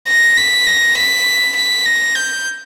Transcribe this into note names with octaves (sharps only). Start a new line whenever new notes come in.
A#6
B6
A#6
B6
B6
A#6
G6